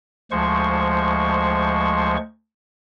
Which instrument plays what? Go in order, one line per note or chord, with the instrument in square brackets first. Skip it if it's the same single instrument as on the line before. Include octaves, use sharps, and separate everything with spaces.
[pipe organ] D2 F3 G#3 C5 C#6